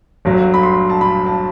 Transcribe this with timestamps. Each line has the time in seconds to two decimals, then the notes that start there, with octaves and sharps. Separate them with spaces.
0.25 G1 G2 F#3
0.54 B5
0.63 C6
0.90 A5
1.01 B5
1.26 A5